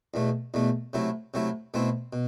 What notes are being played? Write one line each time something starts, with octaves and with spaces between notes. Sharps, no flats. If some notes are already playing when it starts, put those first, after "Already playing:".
E2 B2 A3
E2 B2 A3
C3 F#3 A3 E4
C3 F#3 A3 E4
B2 A3 C4 E4
B2